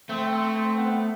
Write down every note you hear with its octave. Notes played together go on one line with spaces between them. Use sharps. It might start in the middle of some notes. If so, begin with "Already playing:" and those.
A3 C4
C4
C4
B3